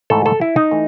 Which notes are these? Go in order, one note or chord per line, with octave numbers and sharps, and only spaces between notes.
G#2 E3 A3 A4
A4
E4
D#4
E3 A3